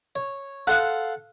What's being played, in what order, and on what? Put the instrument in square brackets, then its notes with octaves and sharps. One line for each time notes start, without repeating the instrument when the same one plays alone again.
[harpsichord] C#5
[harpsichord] A4 C5 F5 [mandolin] F#5